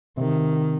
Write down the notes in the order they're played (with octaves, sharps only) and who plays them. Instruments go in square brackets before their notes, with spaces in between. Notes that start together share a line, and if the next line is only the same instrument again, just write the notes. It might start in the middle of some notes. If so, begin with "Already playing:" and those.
[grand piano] C3 [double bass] D#3